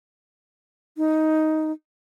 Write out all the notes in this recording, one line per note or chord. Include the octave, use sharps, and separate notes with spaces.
D#4